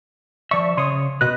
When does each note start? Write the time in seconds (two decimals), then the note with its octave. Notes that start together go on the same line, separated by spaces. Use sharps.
0.51 F3 D5 E5 C#6
0.77 C#3 C#5 C6 D#6
1.21 B2 B4 D#5 F#6